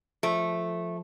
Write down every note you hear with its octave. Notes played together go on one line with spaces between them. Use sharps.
F3 A3